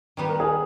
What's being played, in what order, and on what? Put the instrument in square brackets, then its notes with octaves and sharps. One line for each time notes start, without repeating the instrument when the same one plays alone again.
[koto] D#3 G3 B3 G4
[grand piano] A#4
G#4